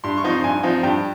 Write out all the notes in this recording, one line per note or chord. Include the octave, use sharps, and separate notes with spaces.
G2 C6
C#6
F3 C4 D#4
C6
G2 G#5
F3 C4 D#4
G2 G5